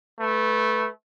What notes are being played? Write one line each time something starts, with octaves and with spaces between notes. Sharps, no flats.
A3 B4